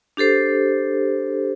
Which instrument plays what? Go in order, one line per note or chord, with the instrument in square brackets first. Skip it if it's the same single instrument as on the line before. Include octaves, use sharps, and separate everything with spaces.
[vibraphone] D4 G4 A4 C5